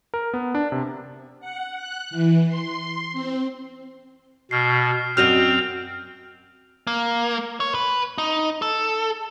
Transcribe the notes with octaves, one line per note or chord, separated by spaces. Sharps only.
A#4
B3
D4
C3
F#5
F#6
E3
C6
C4
B2 F6 C7
F#2 C4 F#4 D#5 F6 G6 F7
A#3
C#5
B4
D#4
A4